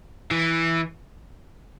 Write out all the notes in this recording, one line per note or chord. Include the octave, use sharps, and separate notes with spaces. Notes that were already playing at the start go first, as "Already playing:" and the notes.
E3